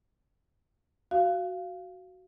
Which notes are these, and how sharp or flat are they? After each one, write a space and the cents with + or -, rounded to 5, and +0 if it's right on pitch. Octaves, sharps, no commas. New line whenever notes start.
F#4 +0 F5 -15